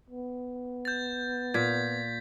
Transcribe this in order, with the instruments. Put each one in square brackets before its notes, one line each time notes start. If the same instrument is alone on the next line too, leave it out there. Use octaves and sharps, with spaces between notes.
[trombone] B3
[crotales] G6 A6
[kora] A#2 [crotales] G#6 B6